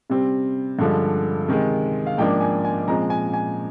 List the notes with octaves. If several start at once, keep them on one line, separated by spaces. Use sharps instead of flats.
C3 G3 C4
G2 D3 F3 G#3
C3 D#3 G#3
F5
G#2 F3 A#3 D4 G5
G#5
G#5
A#2 F3 G#3 C4 A#5
G#5
G#5